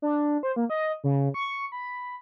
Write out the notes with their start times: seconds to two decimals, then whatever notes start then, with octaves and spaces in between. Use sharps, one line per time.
0.02 D4
0.43 C5
0.56 A#3
0.70 D#5
1.04 C#3
1.34 C#6
1.72 B5